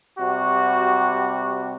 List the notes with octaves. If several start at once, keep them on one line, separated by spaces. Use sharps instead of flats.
C3 G3 F#4